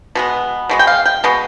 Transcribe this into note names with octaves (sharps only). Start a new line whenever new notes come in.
B2 G#3 B3
B2 G#3 B3
G5
F5
G5
B2 G#3 B3